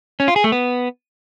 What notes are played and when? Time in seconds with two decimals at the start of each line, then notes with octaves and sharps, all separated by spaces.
0.20 C#4
0.28 F4
0.36 G#4
0.44 A3
0.52 B3